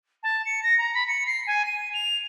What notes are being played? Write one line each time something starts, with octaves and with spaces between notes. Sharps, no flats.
A5
C#7
A#6
A#5
B5
C#7
C7
G#5
D#7
F7